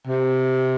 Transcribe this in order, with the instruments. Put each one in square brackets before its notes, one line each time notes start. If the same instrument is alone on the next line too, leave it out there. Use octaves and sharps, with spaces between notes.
[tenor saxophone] C3